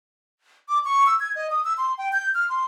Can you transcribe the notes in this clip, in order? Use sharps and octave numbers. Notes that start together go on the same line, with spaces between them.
D6
C#6
E6
G#6
D#5
D#6
E6
C6
G5
G6
F6
C6